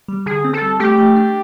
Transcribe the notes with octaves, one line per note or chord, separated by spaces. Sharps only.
G3
D3 G#4
C4
A4
G3
A3 G4
A3
D4